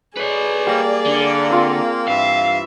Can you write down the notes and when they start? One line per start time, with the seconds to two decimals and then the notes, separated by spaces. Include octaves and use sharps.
0.17 G#4 B4 C#5 D5
0.67 G3 A#3
1.06 D3
1.50 C4 F4 E6
2.08 G2 E3 E5 F5